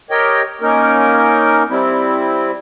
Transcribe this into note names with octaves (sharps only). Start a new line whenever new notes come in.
G4 A#4 C#5 D#5 G5
A#3 C#4 D#4 A#4
G3 C4 E4